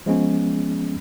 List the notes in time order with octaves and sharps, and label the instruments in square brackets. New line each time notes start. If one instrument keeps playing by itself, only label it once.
[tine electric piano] F3 G#3 B3 C#4